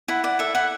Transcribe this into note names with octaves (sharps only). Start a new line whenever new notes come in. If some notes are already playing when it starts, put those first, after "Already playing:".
E4 F#5
D5 F#5
A4 E5
E4 F#5